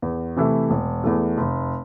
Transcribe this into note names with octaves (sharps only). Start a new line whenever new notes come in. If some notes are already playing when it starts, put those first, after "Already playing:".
E2
C3 E3 A3 E4
E1
E2 E3 A3
F1